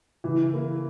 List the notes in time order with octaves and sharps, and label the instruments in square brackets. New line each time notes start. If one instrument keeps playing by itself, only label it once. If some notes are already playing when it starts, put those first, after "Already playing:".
[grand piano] C#3 [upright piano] E3
[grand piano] E3 A#3 E4